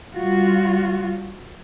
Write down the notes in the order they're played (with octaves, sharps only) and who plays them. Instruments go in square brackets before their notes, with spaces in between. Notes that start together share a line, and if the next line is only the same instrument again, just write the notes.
[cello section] G3 F4 F#4